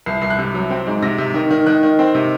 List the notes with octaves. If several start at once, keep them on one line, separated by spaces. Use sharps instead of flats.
C2 C7
C2 C7
F#6
C3
F#3
C4
G#2
C3 A#6
C3
D#3
D#3
D#3 F#6
D#3
C4
C3